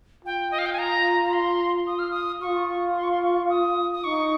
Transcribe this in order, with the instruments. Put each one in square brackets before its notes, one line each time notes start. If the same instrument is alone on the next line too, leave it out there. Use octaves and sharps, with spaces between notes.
[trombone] F4 [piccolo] G5
[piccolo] D#5
F5
G5
G#5
A#5
A#5
C6
D#6
F6
D#6
[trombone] F4 [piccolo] C#6
[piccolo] C6
C#6
C6
C#6
D#6
D#6
[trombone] D#4 [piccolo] C#6